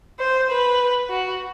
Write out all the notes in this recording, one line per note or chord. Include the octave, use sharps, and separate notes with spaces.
C5
B4
F#4